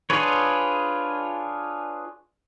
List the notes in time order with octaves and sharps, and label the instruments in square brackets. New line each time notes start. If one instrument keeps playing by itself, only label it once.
[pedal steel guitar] D4 F4 G#4 B4 C#5